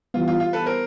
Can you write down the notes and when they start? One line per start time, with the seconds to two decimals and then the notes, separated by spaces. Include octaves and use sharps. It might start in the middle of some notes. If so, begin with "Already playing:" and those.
0.14 E3 G3 B3 F4
0.28 F4
0.40 F4
0.53 A4 B4
0.66 A#4 C5